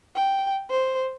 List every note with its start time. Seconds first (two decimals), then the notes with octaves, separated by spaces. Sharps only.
0.16 G5
0.70 C5